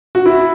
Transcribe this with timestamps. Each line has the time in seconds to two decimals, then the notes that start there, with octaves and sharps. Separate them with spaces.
0.15 F#4
0.26 E4